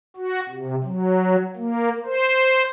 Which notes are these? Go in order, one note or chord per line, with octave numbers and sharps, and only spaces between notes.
F#4
C3
F#3
A#3
C5